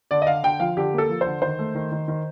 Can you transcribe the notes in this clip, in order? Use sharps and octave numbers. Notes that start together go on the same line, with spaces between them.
D3 D5
D#5
D3 F5
D3 G5
F3 F5
D3 G4
A#3 A4
F3
C5
D3
D#3 C5
A3
D#3
D#3
D#3